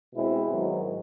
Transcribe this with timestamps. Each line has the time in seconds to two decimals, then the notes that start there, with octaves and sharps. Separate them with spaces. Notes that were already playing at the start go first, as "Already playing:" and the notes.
0.14 B2 G#3 C4 E4
0.50 G#2 D#3 F#3